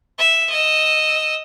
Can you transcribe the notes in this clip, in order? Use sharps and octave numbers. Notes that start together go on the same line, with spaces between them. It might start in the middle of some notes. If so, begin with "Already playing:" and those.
E5
D#5 E6